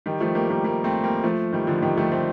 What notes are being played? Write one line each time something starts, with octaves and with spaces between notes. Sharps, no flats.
D#3 G3
F3 A3
G3 A#3
G3 A#3
G3 A#3
A3 C4
G3 A#3
F3 A3
D#3 G3
D3 F3
D#3 G3
F3 A3
A3 C4